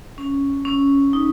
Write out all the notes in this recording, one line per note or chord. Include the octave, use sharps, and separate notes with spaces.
C#4
C#4
D#4